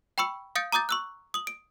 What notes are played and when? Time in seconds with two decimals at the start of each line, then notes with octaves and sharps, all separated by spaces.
0.18 G5 B5 C#6 E6 C#7
0.55 F5 D#6 G6 A6 C#7 D7
0.72 A#5 D6 D#6 G6 A6
0.89 C#6 E6 F#6
1.34 D#6 F#7
1.47 D7